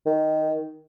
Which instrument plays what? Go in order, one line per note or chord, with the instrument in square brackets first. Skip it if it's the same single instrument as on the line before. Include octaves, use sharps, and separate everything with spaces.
[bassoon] D#3